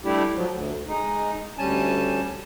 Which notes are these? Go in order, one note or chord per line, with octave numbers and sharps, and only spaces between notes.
G3 A3 D4 E4 G4
F3 F#3
D2
G#3 D#4
D2 G3 C#4 G#5 A5